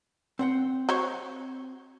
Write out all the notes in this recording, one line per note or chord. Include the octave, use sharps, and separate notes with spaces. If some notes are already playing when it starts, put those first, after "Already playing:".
C4 F#5 G5
F#4 C5 C#5